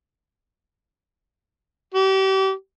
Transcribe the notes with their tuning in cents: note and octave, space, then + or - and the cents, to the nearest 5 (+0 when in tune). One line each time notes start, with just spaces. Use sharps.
G4 -35